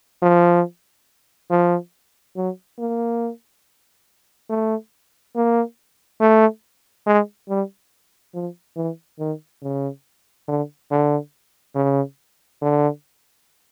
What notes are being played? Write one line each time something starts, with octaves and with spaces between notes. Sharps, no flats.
F3
F3
F#3
A#3
A3
A#3
A3
G#3
G3
F3
E3
D#3
C#3
D3
D3
C#3
D3